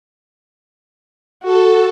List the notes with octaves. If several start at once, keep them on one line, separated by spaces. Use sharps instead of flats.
F#4 A4